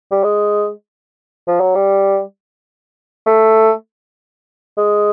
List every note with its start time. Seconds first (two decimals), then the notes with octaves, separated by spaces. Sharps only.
0.12 G3
0.24 G#3
1.48 F3
1.61 F#3
1.75 G3
3.27 A3
4.78 G#3